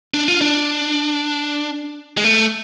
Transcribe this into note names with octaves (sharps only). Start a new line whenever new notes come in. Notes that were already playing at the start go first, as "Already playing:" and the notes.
D4
F4
D4
G#3
A3